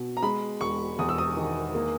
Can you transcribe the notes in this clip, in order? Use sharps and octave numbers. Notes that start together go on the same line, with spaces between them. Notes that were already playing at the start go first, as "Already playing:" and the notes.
Already playing: B2
A#5
G#3 B5
E1 C#6
E2 D#6
E6
D#6
D#3
A#3